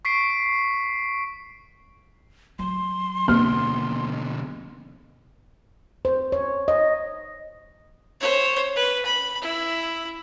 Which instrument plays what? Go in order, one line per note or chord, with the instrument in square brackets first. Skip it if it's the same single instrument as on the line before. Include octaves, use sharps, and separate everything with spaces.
[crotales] C#6 B6 C7 D7
[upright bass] F#3 [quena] C6
[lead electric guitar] B2 D3 [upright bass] F3 A#3 [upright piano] F6
[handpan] C5
C#5
D#5
[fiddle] C5 C#5
B4
B5
E4